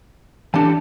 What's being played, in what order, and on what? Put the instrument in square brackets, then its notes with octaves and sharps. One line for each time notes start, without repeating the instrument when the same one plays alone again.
[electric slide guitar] E3 G4 A4 [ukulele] D4 A5